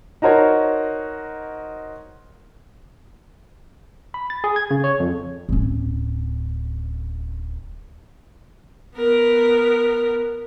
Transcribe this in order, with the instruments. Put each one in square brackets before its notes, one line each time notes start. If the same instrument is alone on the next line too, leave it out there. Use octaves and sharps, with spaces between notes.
[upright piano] D#4 F#4 A#4 C5 C#5
[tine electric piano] B5
A6
G#4
G#6
C#3
C#5
F2
[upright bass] D1 C#4
[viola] B3 A#4